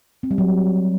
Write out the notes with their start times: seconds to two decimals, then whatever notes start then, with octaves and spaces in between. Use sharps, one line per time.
0.23 C4
0.31 G3
0.38 F#3